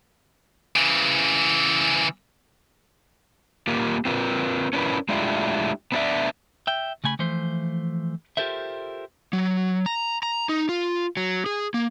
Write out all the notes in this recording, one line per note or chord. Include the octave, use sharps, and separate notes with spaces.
C#3 E3
A#3 F4 G4 A#4
C4 F4 G4 A#4 B4
C#4 D4 E4 A#4 B4
G#3 A3 D4 E4 F4 G4
B3 C#4 D4 G4 D5 E5
E5 G5
C#3 A3 G#5 B5
E3 F3 A3 C5
F4 G4 A4 A#4 C5 E5
F#3
A#5
A#5
D#4
F4
F#3
G#4
A#3